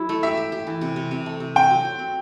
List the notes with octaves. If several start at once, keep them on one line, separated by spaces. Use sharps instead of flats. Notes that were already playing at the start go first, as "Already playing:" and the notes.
Already playing: F#3 E4
A3
G4 E5
G4
G4
E3
C3
C3
C3
A3
C3
C4 G5
F#3
F#3
C4